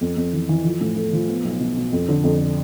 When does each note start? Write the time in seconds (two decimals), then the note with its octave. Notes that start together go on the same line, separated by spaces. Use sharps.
0.01 F2
0.17 F2
0.33 E3
0.49 E3
0.64 F3
0.81 A2
0.96 A3
1.13 F3
1.28 B3
1.45 B1
1.60 B2
1.77 B2
1.93 F2
2.08 D3
2.24 F2